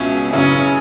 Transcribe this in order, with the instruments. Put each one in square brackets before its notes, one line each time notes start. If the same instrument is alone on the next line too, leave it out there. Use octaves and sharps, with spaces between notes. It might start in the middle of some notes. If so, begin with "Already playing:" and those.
Already playing: [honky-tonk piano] C#2 B2 B3 G#4 E5 [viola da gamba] C#4
[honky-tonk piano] F#2 C#3 E3 [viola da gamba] C#4